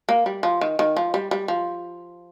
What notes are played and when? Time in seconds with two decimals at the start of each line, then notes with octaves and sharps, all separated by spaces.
0.09 A#3
0.26 G3
0.43 F3
0.61 D#3
0.79 D#3
0.97 F3
1.14 G3
1.31 G3
1.48 F3